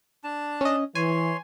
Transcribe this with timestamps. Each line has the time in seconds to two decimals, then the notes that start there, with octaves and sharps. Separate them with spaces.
0.24 D4 A5
0.61 C#4 D#5
0.95 E3 C#5 G#5 C6